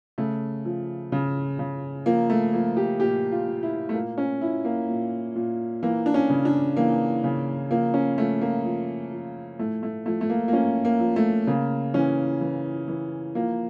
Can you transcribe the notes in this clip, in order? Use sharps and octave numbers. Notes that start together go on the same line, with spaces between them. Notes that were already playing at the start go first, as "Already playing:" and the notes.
C#3 A3
F3
C#3
C#3
F3 A#3
A3
F3 A#3
G4
A#2 G4
F4
A#2
E4
A3
A#2 A#3
C#4
A#2 E4
A#3
A#2
A#2
E3 A#3
D4
C#4
C#3
D4
E3 A#3
C#3
F3 A#3
C#4
F3 A3
A#3
F3
F3
A2 A3
A3
F3 A3
A3
A#3
A#3
F3 C#4
A#3
F3
A3
C#3 A#3
E3 C#4
E3
E3
F3 A#3